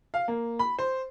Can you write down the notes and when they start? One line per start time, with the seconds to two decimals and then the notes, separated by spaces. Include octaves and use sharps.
0.14 F5
0.28 A#3
0.59 B5
0.79 C5